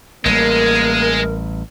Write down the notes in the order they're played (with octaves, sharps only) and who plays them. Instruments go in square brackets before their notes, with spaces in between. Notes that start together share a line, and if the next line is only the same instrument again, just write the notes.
[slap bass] A1 G3 [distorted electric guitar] G#3 [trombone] A#3 [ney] A#4